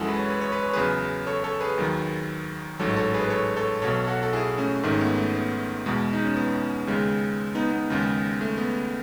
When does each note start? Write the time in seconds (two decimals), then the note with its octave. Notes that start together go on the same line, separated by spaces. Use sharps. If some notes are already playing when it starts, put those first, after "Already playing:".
Already playing: F#2 E3 G#3 E4 F#4 G#4 A4
0.08 B4
0.19 C#5
0.30 B4
0.41 C#5
0.52 B4
0.62 C#5
0.73 E2 C#3 F#3 G#4 B4
1.27 A4 C#5
1.44 A4 C#5
1.60 G#4 B4
1.78 D#2 D#3 F#3
2.79 A1 G#2 F#3 A4 C#5
2.97 A4 C#5
3.14 G#4 B4
3.24 B4
3.30 A4 C#5
3.56 A4 C#5
3.82 B1 B2 F#3 A4 C#5
4.07 F#4 A4
4.23 A4
4.33 E4 G#4
4.58 A3 C#4
4.83 G#1 G#2 D#3 A3 C#4
5.01 B3
5.17 A3
5.35 B3
5.86 E2 B2 G#3
6.13 D#4
6.25 C#4
6.36 B3
6.87 D#2 C#3 G#3
7.55 B3 D#4
7.72 B3
7.90 D#2 C#3 G#3
8.41 A3
8.58 B3